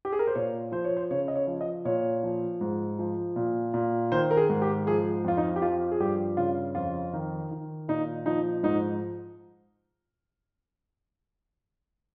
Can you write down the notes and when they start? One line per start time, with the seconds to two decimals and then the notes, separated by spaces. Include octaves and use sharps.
0.05 G4
0.12 G#4
0.19 A#4
0.27 C5
0.35 A#2 C#5
0.72 F3 C5
0.84 C#5
0.97 C5
1.11 C#3 C#5
1.28 D#5
1.36 C#5
1.47 F3
1.61 D#5
1.85 A#2 C#5
2.23 F3
2.61 G#2
2.99 F3
3.36 A#2
3.74 A#2
4.12 D#3 C5
4.31 A#4
4.37 G#4
4.49 G#2
4.62 G4
4.87 F3 G#4
5.24 F2 F4
5.37 D#4
5.56 G4
5.62 F3 F4
5.92 G#4
6.00 G2 G4
6.37 C#3 F4
6.75 F2 F4
7.13 D#3
7.51 D#3
7.88 A#2 D#4
8.26 F3 D#4
8.63 G#2 D#4